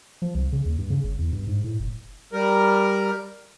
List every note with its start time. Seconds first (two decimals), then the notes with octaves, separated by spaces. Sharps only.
0.22 F3
0.35 C2
0.52 C#3
0.66 D#2
0.78 G2
0.90 C#3
1.04 G1
1.19 E2
1.33 G2
1.47 G#2
1.64 A2
1.80 F#1
2.33 G3 A#4